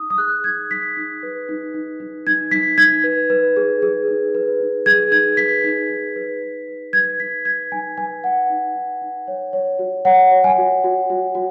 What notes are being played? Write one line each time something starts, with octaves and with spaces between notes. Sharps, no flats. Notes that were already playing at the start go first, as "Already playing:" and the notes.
Already playing: D#4 D#6
D#6
G#4 F#6
D#4 G#6
D#4 B6
D#4
B4
D#4
D#4
D#4
D#4 G#6
D#4 B6
D#4 G#6
B4
B4
G#4
G#4
D#4
B4
D#4
G#4 G#6
D#4 G#6
B4 B6
D#4
D#4
B4
B4
B4
B4 G#6
D#4 B6
B4 G#6
D#4 G#5
B4 G#5
B4 F#5
D#4
D#4
D#4
C#5
C#5
F#4
C#5 F#5
C#5
G#5
F#4
F#4
F#4
F#4